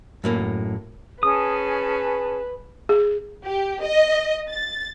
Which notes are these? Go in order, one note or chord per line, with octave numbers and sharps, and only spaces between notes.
F#2 A2 A#3
C#4 G#4 B4 A5 D#6
G#4
G4
D#5
A6